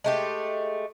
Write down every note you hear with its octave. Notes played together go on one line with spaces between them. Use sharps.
G#3 A3 G4